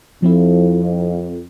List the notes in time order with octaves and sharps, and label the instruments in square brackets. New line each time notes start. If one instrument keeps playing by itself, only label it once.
[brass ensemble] F2 [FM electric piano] F3 C4 E4